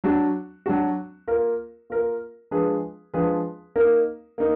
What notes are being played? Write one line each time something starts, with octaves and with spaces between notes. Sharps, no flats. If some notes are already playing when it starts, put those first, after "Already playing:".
F#3 D4 F#4
F#3 D4 F#4
A#3 F4 A#4
A#3 F4 A#4
F3 G#3 D4 G#4 B4
F3 G#3 D4 G#4 B4
A#3 D#4 A#4
A#3 D#4